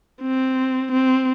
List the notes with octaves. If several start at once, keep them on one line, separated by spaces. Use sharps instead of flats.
C4
C4